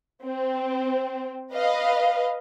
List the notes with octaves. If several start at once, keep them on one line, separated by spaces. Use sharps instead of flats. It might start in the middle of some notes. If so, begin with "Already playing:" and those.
C4
B4 D#5 F5